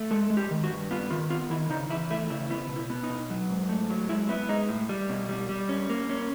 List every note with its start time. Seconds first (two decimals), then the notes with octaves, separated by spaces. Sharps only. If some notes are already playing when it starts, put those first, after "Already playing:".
Already playing: A3
0.11 G#3 A4
0.30 G#3
0.37 G4
0.51 D#3
0.64 F#4
0.71 G2
0.91 B3 F4
1.11 D#3 F4
1.30 B3 F4
1.50 D#3 E4
1.69 C#3 D#4
1.89 E2 E4
2.10 A3 E4
2.30 C#3 E4
2.50 B3 E4
2.69 B2
2.76 E4
2.90 B3
3.03 D#4
3.10 B2
3.30 F#3
3.50 G#2
3.69 A3
3.90 F#3
4.09 G#3 E4
4.29 B3 E4
4.49 G#3 D#4
4.69 A2
4.89 G3
5.09 B2
5.29 G3
5.49 G3
5.69 C#4
5.90 A#3
6.09 C#4